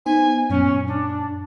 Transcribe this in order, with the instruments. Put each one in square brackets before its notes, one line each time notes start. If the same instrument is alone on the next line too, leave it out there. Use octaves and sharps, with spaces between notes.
[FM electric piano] B3 D#4 C5 [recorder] G#5
[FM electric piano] F#2 A#2 [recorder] C#4
[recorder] D4